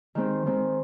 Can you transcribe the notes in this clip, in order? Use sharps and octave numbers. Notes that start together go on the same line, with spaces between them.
D#3 G#3 C4
D#3 G#3 C4